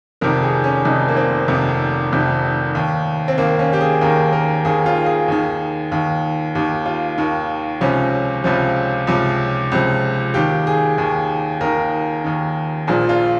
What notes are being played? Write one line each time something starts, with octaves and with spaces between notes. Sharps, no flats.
F1 F2 C3 D#3 A#4
G#4
C#4
F1 F2 C3 D#3 D#4
A#3
C4
F1 F2 C3 D#3
F1 F2 C3 D#3
D#2 D#3
C4
D#2 D#3 A#3
C#4
G4
G#4
D#2 D#3 A#4
A#4
D#2 D#3 G#4
F4
G#4
D#2 D#3
D#2 D#3
D#2 D#3 G4
F4
D#2 D#3
C#2 C3 F3 C#4
C#2 C3 F3 F4
C#2 C3 F3
C#2 C3 F3
D#2 D#3 G4
G#4
D#2 D#3
D#2 D#3 A#4
D#2 D#3
A#1 A#2 F3 G#4
F4